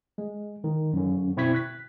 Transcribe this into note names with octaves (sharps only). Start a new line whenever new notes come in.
G#3
D#3
F#2 D3 C#4
B2 C4 E4 C#6 G#6 B6
F#6 B6